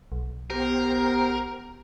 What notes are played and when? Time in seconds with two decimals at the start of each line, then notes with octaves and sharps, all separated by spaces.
0.12 B1
0.50 B3 G4 A#4 C5